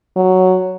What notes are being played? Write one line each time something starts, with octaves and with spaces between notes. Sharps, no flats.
F#3